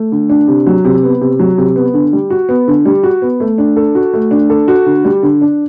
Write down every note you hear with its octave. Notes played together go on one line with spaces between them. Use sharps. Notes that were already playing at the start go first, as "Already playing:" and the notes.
Already playing: A3
D3
D4
C3
F#3
C3
B3
C3
F#3
C3
B3
D3
G3
F#4
B3
D3
G3
F#4
B3
A3
D4
A4
F#4
A3
D4
A4
F#4
D3
G3
D3
D4